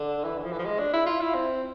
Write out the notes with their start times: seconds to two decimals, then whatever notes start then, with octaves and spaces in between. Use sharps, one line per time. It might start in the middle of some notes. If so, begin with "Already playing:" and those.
Already playing: D3
0.25 E3
0.39 D3
0.44 F3
0.52 E3
0.59 F3
0.65 G#3
0.79 D4
0.93 E4
1.06 F4
1.21 E4
1.34 C4